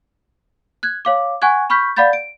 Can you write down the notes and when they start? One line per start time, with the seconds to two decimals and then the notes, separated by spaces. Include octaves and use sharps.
0.83 F#6 G#6
1.05 C#5 F5 D6
1.42 F#5 G#5 C#6 F#6 G#6
1.70 B5 C#6 F6 G6 B6
1.96 D5 F5 F#5 B5 G6 A6
2.13 D7